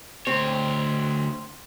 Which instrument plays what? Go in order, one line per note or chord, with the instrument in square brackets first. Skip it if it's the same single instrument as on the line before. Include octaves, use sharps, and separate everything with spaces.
[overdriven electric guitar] D2 C#5 [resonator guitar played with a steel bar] C4